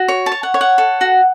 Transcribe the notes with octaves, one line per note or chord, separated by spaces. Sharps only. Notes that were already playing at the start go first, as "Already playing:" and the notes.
Already playing: F#4
C#5
A5
C#5
F#5
C#5
F#5
A4
F#4